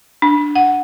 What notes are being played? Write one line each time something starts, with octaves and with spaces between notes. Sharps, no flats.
D4
F#5